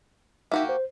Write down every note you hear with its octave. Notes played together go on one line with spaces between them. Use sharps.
A#3 D#4 F#4 G4 E5
C5